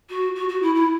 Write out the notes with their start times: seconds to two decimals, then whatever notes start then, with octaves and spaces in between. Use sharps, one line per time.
0.10 F#4
0.35 F#4
0.49 F#4
0.62 E4
0.75 E4